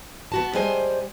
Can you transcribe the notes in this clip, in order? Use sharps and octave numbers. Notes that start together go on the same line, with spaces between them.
B3 F#4 A5
G3 G#3 G#4 C5 G#5